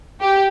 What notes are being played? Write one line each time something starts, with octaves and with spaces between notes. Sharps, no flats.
G4